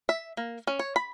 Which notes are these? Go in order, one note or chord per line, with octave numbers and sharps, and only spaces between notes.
E5
A#3
C#4
C#5
B5